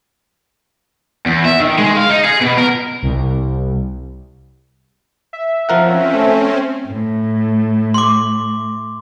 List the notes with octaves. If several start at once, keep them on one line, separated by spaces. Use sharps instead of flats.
E2
E5
D#3
G#3
F5
D#4
G#4
B2
A#4
C2
E5
F3 C4 C#4 A#4 F#5
A3
A2
C6 D6